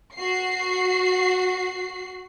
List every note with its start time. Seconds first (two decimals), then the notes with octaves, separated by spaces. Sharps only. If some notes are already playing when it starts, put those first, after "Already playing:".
0.16 F#4 C7